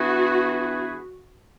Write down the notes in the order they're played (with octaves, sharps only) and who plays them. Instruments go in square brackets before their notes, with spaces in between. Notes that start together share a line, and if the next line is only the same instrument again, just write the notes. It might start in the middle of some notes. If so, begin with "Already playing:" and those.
Already playing: [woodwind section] E3 B3 D4 G#4 B4 [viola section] F#4